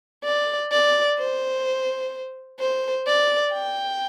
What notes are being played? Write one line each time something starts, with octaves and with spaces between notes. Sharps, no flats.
D5
D5
C5
C5
D5
G5